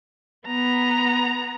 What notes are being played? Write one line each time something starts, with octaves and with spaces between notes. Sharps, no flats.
B3 A#5